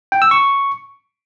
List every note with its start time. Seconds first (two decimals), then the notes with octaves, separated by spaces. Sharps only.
0.12 G5
0.22 E6
0.31 C#6